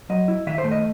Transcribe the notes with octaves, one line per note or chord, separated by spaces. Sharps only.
F#3 D#5
E4
D#3 E5
C5
A3
D#5